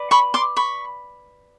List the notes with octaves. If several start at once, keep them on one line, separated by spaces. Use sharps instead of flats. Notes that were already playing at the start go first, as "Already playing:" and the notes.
Already playing: B4 D5
B5 C#6
C6 D6
B5 C#6